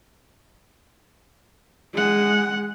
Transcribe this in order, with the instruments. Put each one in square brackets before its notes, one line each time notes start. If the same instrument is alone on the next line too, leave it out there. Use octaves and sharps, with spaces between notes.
[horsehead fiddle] G#3 F#5